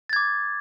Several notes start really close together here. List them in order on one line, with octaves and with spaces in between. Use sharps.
A6 G#6 D6